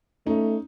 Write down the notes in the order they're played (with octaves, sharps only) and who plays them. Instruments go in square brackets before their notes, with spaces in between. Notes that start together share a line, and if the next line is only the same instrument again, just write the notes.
[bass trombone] A3 [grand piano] C#4 D#4